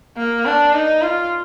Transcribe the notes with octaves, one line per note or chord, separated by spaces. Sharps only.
A#3
D4
D#4
F4